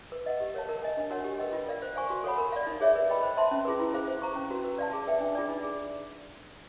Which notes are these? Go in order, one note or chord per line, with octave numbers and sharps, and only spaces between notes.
B4
D#5 F#5
G4
A#4 C#5 F5 A5
A#4
D#5 G#5
D4
F#4 A#4 C#5 F#5
G4
B4 D#5 G5
F4
A#4 D5 F5
C5
F5 G#5 C#6
F#4
A4 C#5 F#5 B5
A#4
D5 F5
D#4
G#4 C#5 E5
B4
D#5 G5 B5
C5
E5 A5 C6
C#4
F4 G#4 B4
E4
G#4 C5 F5
C5
F5 A#5 C#6
C#4
F#4 B4
B4
D5 F5 A5
G#4
B4 E5 G5
D4
F4 G#4 B4 D5
D#4
G#4